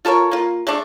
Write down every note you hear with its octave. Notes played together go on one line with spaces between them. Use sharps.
F4 A4 A#4 C#5
A#3 F4
G#3 A3 D4